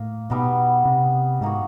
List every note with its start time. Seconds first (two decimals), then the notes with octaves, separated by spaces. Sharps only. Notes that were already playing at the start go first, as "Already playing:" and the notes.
Already playing: A2 A#3 D#4
0.30 B2 G3 B3 D#4
0.85 C3
1.41 G#2 A#3 D#4 F#4